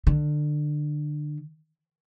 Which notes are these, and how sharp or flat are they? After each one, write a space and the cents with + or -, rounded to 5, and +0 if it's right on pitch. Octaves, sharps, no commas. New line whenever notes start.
D3 +25